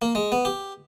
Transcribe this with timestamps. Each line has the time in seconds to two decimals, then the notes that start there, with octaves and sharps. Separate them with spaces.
0.02 A#3
0.15 G#3
0.32 B3
0.45 G4